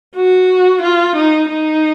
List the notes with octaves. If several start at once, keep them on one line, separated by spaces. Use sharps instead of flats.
F#4
F4
D#4
D#4